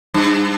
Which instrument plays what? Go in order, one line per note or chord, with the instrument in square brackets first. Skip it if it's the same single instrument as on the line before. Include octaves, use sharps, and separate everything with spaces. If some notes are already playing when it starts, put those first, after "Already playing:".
[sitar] G2